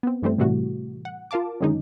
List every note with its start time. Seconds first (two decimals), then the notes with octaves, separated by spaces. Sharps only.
0.03 B3 C4
0.22 G2 E3 G3 A3 C4
0.38 A2 C3 E3 G3 A3 F#4
1.05 F#5
1.31 F4 A#4 F5 A5 D6
1.61 F#2 D3 D#3 G#3 C#4 D#4